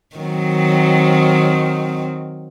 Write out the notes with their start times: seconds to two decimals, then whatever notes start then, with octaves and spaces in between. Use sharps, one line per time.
0.17 D#3 F#3 C4